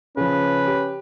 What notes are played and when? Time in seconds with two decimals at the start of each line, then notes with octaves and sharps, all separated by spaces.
0.17 C#3 F3 C#4 B4
0.67 G4